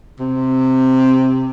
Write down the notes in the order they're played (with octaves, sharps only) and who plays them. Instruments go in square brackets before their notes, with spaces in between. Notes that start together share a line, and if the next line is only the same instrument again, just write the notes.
[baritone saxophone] C3